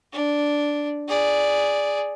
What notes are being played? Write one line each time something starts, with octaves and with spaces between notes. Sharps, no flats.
D4
G#4 D5